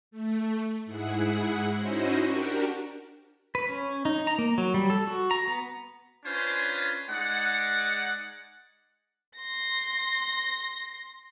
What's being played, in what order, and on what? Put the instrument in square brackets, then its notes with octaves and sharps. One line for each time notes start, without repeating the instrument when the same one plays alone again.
[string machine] A3
G#2 E4 G#4 F#5
C#4 D#4 E4 F#4 C5 D#5
D4 F#4 G4 A#4
[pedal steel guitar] B4
C#4
D#4
A#5
A#3
F#3
G3
A4
F#4
A#5
B3
[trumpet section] C#4 D4 F4 B4 C5 G#5
G#3 D#4 D5 F#5
[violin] C6 A#6